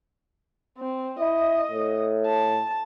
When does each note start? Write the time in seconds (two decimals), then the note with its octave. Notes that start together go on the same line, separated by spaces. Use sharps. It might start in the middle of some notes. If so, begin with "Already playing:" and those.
0.78 C4
1.20 E4 D#5
1.71 A2
2.26 A5